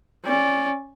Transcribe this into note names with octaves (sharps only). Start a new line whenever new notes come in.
C#4 D5